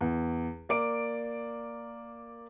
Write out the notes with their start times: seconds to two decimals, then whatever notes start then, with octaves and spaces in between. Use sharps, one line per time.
0.01 E2
0.69 A#3 D5 D7